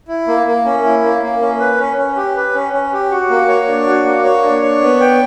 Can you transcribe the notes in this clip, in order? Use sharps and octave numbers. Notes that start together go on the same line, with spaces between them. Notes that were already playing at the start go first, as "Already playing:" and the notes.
E4
A#3
A#3
C#4
E4
A#3
A#3
C#4
B4
C#4
C#4
G4
B4
C#4
C#4
G4
F#4
A#3
C#5
D4
F#4
A#3
C#5
D4
C#5
B3
G5